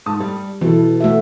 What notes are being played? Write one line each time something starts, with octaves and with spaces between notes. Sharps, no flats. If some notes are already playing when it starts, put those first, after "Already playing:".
G#2 A5 D#6
G3
B2 E3 A4
A3 F#4 E5